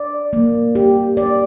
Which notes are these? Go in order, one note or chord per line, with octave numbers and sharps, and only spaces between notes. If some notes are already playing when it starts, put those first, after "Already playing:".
Already playing: D5
A#3
G4
D5